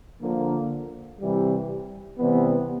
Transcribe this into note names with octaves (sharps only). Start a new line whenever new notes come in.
D3 F3 A#3
C3 E3 G3
C3 E3 G3 B3